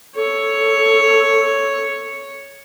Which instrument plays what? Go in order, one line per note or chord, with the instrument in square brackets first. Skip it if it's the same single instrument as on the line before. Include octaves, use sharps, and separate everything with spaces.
[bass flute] A4 [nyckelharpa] C#5